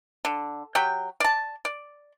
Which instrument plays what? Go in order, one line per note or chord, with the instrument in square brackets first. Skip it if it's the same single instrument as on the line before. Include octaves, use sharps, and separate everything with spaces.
[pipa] D3
F#3 G4 G5
D5 A5
D5